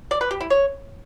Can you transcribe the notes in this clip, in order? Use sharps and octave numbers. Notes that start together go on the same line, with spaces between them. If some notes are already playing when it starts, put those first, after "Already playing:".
D5
B4
G4
E4
C#5